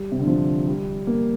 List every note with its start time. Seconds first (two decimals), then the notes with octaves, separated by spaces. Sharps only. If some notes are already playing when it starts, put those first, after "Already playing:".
Already playing: G3
0.12 C3
0.19 D3
0.27 F3
0.67 G3
1.07 A#3